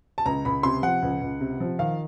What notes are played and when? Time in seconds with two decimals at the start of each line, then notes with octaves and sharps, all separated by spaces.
0.18 A5
0.25 C#2 A#5
0.45 C#2 B5
0.63 C3 C6
0.83 F3 F#5
1.02 C#2
1.21 C#2
1.40 C3
1.60 F3
1.79 D#3 F5